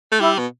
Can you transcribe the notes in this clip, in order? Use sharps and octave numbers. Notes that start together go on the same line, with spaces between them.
A3
G3 E4
B2